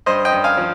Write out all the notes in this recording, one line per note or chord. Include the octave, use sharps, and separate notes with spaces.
G2 C5 D#5
D#5 G5
G2
F5 G#5
F3